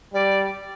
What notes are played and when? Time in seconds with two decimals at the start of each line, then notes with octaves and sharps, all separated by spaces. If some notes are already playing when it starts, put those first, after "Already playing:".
0.13 G3 D5